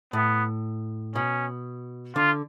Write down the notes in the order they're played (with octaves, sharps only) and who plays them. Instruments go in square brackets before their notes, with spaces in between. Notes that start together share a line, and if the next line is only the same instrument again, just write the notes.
[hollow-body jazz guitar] A2 [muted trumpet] B3
[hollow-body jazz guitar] B2 [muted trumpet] C#4
[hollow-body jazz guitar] D3 [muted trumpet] F4